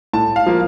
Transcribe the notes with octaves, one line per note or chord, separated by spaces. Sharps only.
A2 A5
F5
F3 A#3